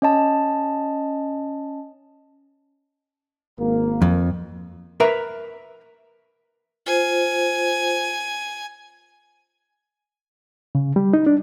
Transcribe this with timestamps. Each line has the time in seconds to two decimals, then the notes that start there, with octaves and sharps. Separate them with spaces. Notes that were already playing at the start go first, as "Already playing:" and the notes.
0.02 C#4 D#5 A5
3.59 G#1 A#3
4.02 F2
5.00 A#4 B4 E5 A#5
6.86 F4 C5 G#5
10.75 C#3
10.96 G3
11.13 D#4
11.27 D4